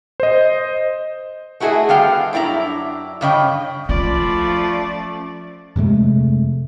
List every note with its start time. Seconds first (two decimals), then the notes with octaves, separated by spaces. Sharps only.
0.20 C5 D#5
1.60 A3 E4 F#4 G#4 A4 D#5
1.89 G3 B3 F5 G5
2.33 F#2 D4 E4 F#4 A#5
3.21 G2 C#3 D#5 G5
3.89 F3 A3 C#4 F4 D5 B5
5.76 F2 C3 G#3 A3